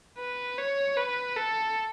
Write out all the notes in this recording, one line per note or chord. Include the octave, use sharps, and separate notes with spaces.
B4
C#5
B4
A4